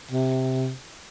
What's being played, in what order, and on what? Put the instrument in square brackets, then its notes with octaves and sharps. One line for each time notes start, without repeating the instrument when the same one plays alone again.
[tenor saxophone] C3